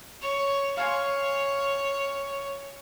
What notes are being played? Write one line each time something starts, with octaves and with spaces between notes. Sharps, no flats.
C#5
C#5 F5 G#5 C6